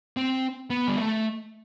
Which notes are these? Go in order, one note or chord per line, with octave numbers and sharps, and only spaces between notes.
C4
B3
G3
A3